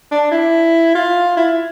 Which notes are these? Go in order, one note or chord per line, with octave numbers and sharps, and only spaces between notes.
D4
E4
F4
E4